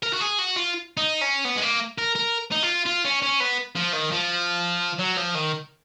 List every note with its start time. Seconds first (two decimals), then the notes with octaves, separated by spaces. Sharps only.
0.02 A#4
0.13 F#4
0.20 G#4
0.39 F#4
0.56 F4
0.97 D#4
1.21 C#4
1.45 B3
1.57 G#3
1.62 A#3
1.98 A#4
2.15 A#4
2.52 D#4
2.63 F4
2.86 F4
3.05 C#4
3.22 C#4
3.40 B3
3.75 F3
3.93 D#3
4.11 F3
4.99 F#3
5.17 F3
5.35 D#3